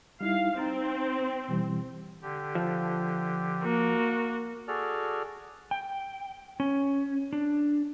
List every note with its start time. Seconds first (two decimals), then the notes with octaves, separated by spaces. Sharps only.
0.21 G3 D#4 E4 F5
0.58 C4 D#4 A#5 A6
1.48 B2 E3 G3
2.22 D3 G4
2.55 F3
3.63 A#3 F#4
4.68 F#4 G#4 A4 D5 F6
5.71 G5
6.60 C#4
7.33 D4